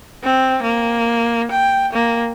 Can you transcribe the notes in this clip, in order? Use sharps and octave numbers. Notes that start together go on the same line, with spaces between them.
C4
A#3
G5
A#3